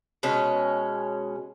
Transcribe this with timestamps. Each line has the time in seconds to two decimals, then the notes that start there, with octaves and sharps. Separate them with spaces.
0.23 B2 G#3 C#4